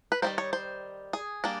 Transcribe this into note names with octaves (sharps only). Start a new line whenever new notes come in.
B4
D#3 G3 A#3 C5
C#5
C5
G#4
G3 A#3 D4